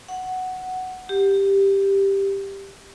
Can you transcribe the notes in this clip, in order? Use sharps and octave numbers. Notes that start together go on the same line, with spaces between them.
F#5
G4